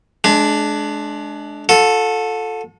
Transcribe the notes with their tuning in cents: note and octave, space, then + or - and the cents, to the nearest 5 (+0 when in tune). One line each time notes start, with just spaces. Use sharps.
G#3 +30 D4 +0
F#4 -45 A4 +0